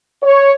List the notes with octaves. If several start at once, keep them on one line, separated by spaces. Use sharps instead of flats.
C#5